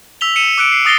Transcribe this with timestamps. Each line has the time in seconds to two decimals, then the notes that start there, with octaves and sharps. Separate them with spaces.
0.21 E6 B6 F7 G7
0.36 C#7 D#7 E7
0.58 D6 E6 F#6 C#7 D7
0.72 C7
0.86 D#6 A6 A#6 C7 G7